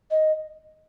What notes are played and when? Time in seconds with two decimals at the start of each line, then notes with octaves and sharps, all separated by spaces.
0.11 D#5